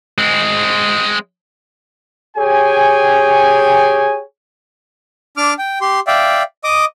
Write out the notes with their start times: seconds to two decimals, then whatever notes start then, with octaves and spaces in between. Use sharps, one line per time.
0.18 G#3 C4
2.37 G4 G#4 C#5 G5 G#5
5.37 D4 D6 F6
5.59 G5
5.81 G4 C6
6.07 D5 E5 F5 G5
6.64 D#5 D6 D#6